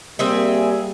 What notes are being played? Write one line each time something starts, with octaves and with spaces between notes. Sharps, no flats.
G3 A#3 C4 G#4 E5